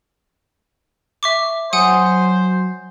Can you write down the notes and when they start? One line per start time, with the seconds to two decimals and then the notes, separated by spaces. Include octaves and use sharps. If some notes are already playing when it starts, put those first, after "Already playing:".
1.23 E5 C#6 D6
1.73 F#3 C5 F#5 G#5 D#6